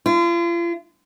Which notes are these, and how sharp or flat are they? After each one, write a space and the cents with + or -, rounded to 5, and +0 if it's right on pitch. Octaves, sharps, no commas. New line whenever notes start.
F4 -40